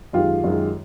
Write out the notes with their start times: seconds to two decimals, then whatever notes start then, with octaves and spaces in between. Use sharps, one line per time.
0.13 F#2 D#3 G#3 F4 G4
0.44 F#2 D#3 G#3